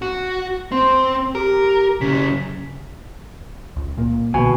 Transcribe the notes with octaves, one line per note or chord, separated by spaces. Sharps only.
F#4
C4 C6
G4 A#4
F#2 C#3 B6
C#2
A#2 A#3
B1 B2 D3 E3 G#5